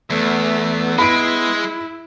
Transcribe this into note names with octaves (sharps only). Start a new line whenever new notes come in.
E2 A3 B3
G#3 E4 B5 D7